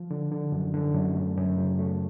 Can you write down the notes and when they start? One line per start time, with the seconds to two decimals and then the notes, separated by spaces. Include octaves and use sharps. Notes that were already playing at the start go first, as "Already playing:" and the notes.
Already playing: F3
0.11 D3
0.32 D3
0.52 F#2
0.74 D3
0.94 F#2
1.15 A3
1.37 F#2
1.57 C#3
1.79 A3